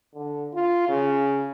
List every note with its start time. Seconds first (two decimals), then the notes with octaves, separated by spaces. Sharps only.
0.15 D3
0.54 F4
0.89 C#3